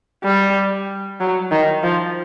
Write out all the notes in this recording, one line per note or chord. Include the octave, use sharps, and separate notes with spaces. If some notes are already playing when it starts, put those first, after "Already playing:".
G3
F#3
D#3
F3